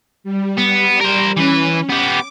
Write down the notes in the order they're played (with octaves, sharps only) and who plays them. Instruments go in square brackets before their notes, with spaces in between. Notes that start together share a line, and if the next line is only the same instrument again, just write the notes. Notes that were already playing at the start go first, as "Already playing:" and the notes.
[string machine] G3
[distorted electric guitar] B3
A#4 C5
[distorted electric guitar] E3 B4 [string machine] C#4
[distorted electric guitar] B3 G4 [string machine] D6